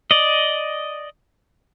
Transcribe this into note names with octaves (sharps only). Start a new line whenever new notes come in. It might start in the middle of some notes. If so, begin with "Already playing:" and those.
D5 D#5